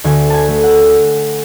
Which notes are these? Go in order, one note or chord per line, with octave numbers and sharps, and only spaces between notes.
D2 G#5
G#5 A5
A3
F#5